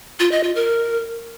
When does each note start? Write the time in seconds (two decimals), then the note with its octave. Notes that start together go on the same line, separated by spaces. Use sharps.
0.20 F4
0.32 D#5
0.43 F4
0.55 A#4